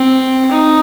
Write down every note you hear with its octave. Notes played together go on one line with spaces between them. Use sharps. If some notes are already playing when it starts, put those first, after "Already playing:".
Already playing: C4
D#4